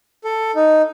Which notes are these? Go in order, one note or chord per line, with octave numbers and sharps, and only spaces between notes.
A4
D#4